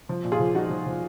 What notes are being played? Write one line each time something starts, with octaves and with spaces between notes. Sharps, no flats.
F3
A#2
F4 G#4
F3
F3 D#4 F#4
F3
F3